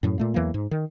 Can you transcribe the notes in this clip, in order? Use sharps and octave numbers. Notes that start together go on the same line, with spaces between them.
F#2 A2 F#3
A#2 A3 A#3
E2 E3 F#3 A#3
G#2
D#3